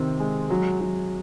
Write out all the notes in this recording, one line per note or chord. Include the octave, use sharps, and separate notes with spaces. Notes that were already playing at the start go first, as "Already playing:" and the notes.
Already playing: C3 D#3 C4
G#3
F#3
F#3